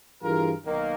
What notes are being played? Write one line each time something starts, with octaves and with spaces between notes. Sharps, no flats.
G2 E3 F4 G#4 A#4
B1 D#3 A#3